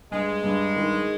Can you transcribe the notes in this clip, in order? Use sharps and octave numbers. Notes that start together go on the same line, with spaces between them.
G2 G#3
G2
D#3